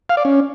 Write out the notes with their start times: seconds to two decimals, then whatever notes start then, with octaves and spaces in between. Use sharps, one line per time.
0.10 F5
0.17 D5
0.25 C#4